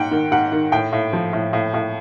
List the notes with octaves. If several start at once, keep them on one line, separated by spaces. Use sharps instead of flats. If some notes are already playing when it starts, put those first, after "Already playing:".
Already playing: G#2 F#5 G5
D#3
G#2 F#5
D#3
A2 G5
A2
F3
A2
A2
A2